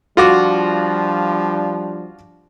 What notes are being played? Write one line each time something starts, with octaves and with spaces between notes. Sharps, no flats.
F3 G3 D4 F4 F#4 D6